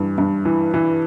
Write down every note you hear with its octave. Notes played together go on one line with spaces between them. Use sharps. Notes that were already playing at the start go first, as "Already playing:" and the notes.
Already playing: G2 E3
G2
E3
E3